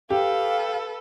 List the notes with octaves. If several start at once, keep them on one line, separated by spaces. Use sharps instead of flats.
G4 A4 B4 F5